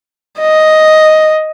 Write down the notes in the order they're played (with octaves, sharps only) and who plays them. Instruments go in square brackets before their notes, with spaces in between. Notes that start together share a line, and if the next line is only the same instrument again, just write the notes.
[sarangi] D#5